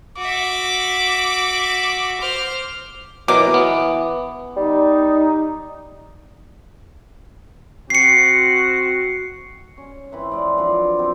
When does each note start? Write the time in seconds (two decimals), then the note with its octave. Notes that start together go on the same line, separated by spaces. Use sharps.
0.17 F#4 E5 D6
2.20 C5 F6
3.28 B2 E3 F#3 A#4 D6
3.54 B3
4.57 G3 D#4
7.90 C4 F#4 C7 C#7
9.77 C#4
10.12 E3 C4 E4 B4
10.31 G#3 D5
10.57 D3 F3 F#3 D5
10.99 B3 C4 G4 A#4